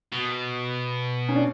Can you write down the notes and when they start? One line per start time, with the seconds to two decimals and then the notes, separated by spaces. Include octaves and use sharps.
0.12 B2
1.29 C#4
1.36 D4